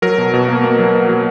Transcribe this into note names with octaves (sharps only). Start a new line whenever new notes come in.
F#3 A#4
B2
B2
A#3
A#3
F#3
B2
F#3